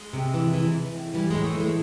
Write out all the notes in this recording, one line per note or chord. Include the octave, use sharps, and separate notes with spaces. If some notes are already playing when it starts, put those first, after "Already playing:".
Already playing: G#3
C3
E3
E3
E3
A2
E3 G3
A2 G#3
A3
E3
G#3